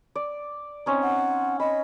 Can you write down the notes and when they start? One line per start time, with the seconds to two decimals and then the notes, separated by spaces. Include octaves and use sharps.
0.15 D5
0.86 C4 C#4 D#4
1.03 F#5
1.60 D#5 B5